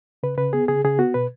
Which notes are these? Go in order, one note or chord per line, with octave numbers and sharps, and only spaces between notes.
C#3 B4
C#3 B4
B3 G#4
C#3 G#4
C#3 G#4
B3 F#4
B2 B4